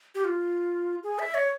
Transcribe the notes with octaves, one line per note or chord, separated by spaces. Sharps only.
G4
F4
G#4
E5
C#5